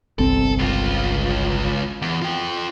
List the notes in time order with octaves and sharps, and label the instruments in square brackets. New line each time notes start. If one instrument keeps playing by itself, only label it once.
[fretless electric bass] G1 C2 C4 [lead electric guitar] A4
[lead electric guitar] C#2 F4
E2
F4 G5